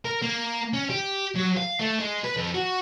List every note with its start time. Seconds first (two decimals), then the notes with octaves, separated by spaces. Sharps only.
0.05 A#4
0.22 A#3
0.73 C#4
0.90 G4
1.35 F#3
1.57 F5
1.80 A3
2.00 G#3
2.25 B4
2.37 F2
2.54 F#4